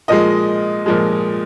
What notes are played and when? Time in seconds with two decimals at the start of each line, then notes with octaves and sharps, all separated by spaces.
0.08 A#2 F3 G#3 D#5
0.86 A#2 F3 G#3